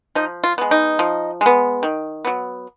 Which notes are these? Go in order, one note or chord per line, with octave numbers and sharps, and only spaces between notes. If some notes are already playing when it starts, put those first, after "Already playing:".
F3 D#4
F4
G#3 B3
D#4
F3
G#3 B3
D#3
F#3 B3